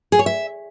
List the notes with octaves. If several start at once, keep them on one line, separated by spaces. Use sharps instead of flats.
G#4
C#5
E5